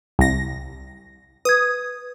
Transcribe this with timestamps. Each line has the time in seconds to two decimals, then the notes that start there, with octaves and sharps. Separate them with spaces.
0.19 C2 A#6
1.45 B4 D#6 G#6